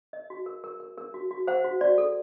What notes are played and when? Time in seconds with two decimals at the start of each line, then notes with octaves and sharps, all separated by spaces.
0.13 A#4 D#5
0.30 F#4
0.46 A#4
0.64 A#4
0.80 A#4
0.98 A#4
1.14 F#4
1.31 F#4
1.47 C5 F#5
1.64 F#4
1.81 F#4 D5
1.98 A4